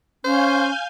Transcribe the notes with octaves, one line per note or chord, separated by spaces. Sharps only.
C#4 C5 F5 G#5 G6